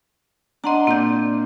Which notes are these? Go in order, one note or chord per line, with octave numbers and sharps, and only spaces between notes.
D4 D#5 F#5 A#5 C6
A#2 C4 G6